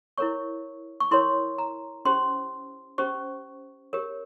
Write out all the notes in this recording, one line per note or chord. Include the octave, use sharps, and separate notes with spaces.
E4 A#4 C#5 C#6
C#6
E4 A#4 C#5 C6
A#5
C#4 G4 C5 C6
C#4 G4 C5 C#6
G4 A#4 C#5